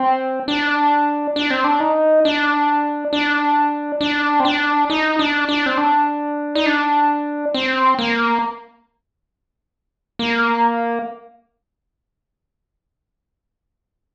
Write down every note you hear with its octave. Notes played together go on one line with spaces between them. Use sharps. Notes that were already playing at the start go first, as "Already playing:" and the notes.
Already playing: C4
D4
D4
C4
D4
D#4
D4
D4
D4
C4
D4
D#4
D4
D4
C4
D4
D#4
D4
C4
A#3
A#3